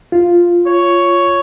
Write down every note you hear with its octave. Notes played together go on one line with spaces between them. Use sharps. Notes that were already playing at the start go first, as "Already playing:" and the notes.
F4
C#5